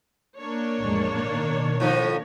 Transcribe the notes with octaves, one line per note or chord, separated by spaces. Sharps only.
A#3 D4 C#5
A1 F2 G#3
B2 D#3
A2 F3 D#4